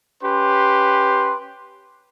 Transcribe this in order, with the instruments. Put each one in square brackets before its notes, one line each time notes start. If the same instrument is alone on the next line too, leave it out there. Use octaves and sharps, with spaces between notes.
[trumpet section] C#4 G4 B4 C6